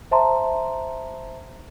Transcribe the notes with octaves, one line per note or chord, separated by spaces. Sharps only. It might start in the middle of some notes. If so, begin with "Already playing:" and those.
C5 E5 A5 A#5 C6